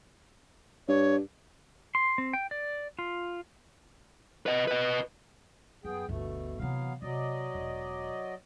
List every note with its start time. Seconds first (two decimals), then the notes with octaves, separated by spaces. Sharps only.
0.88 G2 C#5
1.95 C6
2.18 C4
2.33 G5
2.51 D5
2.99 F4
4.46 B4 D#5
4.68 B4 D#5
5.84 F#2 B3 G#4 G5
6.09 G1 D2 B2 A3
6.59 C3 E3 F#3 B3 F5
7.02 C3 F#3 D5 D#5
7.54 E1